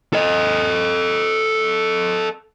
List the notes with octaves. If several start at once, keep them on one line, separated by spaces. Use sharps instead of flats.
A4 D#5